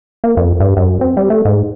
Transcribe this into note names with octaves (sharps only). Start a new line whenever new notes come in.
A#3
F2
G2
F#2
C4
G3
A3
G#2